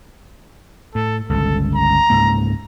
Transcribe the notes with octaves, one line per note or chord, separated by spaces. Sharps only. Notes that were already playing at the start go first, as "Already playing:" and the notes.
A2 A4
G1 C#2 A4
A#5
C#2 G#2 A#3